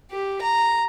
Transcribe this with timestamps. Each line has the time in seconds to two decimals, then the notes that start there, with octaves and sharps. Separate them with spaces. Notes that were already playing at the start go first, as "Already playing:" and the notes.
0.11 G4
0.42 A#5